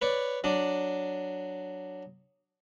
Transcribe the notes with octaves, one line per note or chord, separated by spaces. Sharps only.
B4 C#5 D5
F#3 D4 D5 D#6